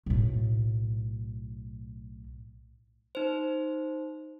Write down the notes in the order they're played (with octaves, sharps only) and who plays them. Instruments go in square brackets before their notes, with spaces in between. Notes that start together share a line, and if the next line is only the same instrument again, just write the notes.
[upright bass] B1 A2
[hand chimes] D#4 C5